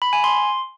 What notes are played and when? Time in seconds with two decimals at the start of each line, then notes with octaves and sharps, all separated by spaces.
0.02 B5
0.13 G#5
0.24 C6